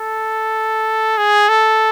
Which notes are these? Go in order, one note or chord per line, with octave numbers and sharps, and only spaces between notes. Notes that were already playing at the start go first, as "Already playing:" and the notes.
Already playing: A4
G#4
A4